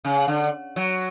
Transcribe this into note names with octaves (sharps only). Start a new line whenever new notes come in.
C#3
D3
F#3